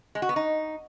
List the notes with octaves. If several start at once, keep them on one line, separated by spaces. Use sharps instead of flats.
G#3
F#4
B3
D#4